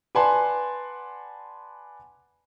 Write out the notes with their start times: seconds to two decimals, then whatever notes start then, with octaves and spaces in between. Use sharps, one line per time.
0.15 B4 D5 F#5 G#5 A5 C6